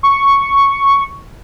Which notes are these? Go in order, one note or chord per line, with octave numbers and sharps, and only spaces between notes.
C#6